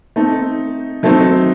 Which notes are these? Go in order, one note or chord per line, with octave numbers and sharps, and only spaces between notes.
A3 C4 D#4
F#3 A3 C4 D#4